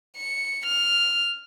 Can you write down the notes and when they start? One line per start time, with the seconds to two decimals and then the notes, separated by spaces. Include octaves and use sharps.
0.17 C#7
0.66 F6